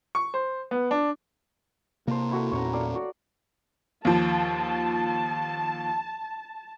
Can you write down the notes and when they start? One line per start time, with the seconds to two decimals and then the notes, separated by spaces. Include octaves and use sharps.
0.15 C#6
0.34 C5
0.71 B3
0.91 D4
2.07 C3 A#3 C5 A5 A#5
2.31 E4 F#4 A4
2.52 E2 A#2 C#4 C#5 F#5 A#5
2.73 A4 D5 F5
2.95 F#4
4.05 D#2 F3 A5